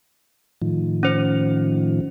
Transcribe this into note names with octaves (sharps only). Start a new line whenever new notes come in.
A2 D#3 F3
C#4 C5